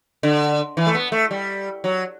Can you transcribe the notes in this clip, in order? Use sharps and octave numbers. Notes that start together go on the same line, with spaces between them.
D3
E3
A3
B3
A3
G3
F#3